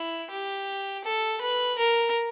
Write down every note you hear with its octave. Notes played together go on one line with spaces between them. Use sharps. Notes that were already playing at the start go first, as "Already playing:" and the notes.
Already playing: E4
G4
A4
B4
A#4